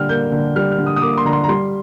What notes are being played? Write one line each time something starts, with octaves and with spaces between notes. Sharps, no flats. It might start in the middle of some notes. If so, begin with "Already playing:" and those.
Already playing: D3 G3 G5 F6
A#3 G6
D3
G3 F6
F6
D3
D#6
D#6
A#3 D6
C6
D3 A#5
C6
A#5
G3 C6